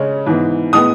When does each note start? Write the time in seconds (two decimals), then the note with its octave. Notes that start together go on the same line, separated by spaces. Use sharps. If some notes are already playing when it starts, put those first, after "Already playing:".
Already playing: C#3 G#3 C#4
0.27 G#2 E3 B3
0.73 A2 G#3 B3 D#6